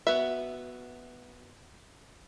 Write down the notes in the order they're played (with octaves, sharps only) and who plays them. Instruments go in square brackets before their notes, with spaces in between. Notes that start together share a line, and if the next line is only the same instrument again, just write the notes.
[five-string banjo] B3 F#4 E5